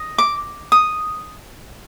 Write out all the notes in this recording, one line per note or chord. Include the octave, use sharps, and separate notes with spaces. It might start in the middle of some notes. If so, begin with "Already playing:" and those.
Already playing: D#5
D6
D#6